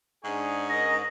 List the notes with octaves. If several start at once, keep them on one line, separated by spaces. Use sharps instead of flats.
G#2 D4 G#4 G#5 C#6
C#4 A#4 D#5 A#6